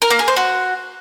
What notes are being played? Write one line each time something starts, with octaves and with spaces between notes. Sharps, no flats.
A#4
A#3
G#4
C5
F#4